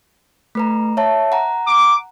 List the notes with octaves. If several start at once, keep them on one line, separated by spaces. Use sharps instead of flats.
A3 B4 A#5
C#5 E5 A5
F#5 A#5
D6